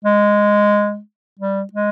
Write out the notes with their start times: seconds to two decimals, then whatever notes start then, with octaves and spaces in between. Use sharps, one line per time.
0.05 G#3
1.39 G3
1.73 G#3